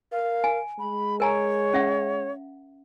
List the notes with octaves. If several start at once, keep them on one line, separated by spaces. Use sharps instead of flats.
A#4 F5
G#5
G#3 B5
A#4 C#5 G#5 A#5
C#4 E5 F#5